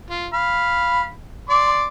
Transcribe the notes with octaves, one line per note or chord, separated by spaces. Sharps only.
F4
F5 B5
D5 C6 D6